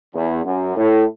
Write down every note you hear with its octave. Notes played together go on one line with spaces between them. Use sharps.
E2
F#2
A2